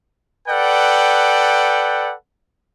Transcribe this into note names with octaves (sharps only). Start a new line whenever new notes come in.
A4 B4 D5 F#5 G5